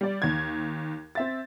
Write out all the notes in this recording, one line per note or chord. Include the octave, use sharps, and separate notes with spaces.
G3 D5
D#2 G#6
C4 E5 A6